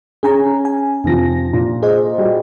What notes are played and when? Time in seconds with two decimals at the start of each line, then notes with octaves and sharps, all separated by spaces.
0.23 C#4 G#4 G#5 A#5
0.65 G#5
1.04 F2 C3 F3 A#6
1.53 A#2
1.82 G#4 C5 D#5
2.18 G3 F#4